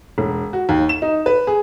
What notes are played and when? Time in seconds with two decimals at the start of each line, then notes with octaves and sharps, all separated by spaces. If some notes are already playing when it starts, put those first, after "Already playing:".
0.18 E1
0.53 F#4
0.69 D#2
0.89 E7
1.02 D#4
1.26 B4
1.47 G#4